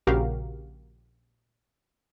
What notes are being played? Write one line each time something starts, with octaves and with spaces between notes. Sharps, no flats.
A#1 C#3 F#4 G4 A#4 F5